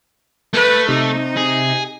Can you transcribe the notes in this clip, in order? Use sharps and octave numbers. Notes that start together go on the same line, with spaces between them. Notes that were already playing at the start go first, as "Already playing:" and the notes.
A3 B4
C3 D#4
G#4